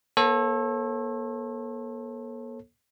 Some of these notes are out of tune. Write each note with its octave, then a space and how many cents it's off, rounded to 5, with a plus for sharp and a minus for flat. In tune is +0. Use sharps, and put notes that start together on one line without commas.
A#3 +40 A4 +0 C#5 -40